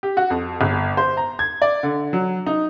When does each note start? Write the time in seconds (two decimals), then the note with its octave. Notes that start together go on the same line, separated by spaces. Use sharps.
0.03 G4
0.17 F#4
0.30 F2
0.61 G1
0.97 C5
1.17 A#5
1.39 G#6
1.62 D5
1.83 D3
2.13 F#3
2.46 D#4